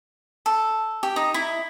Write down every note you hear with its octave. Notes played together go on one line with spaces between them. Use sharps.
A4
G4
D#4
E4